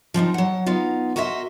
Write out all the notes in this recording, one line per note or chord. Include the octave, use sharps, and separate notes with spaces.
F3 C4 D4 D#4
F#3 F#5
B3 D#4 F4
F#4 A#4 C5 D#5 E5